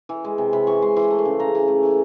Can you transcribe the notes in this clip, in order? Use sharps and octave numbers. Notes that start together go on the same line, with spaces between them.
E3
G#3
C3
C3 B5
E3 C#6
G#3 C6
E3 C6
A3
C6
C#3
C#3 A#5
E3
A3
E3